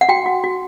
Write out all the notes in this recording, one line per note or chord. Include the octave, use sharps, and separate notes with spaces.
F#5
F#4 G5
F#4
F#4